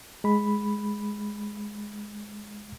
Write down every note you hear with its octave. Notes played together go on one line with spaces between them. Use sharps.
G#3 B5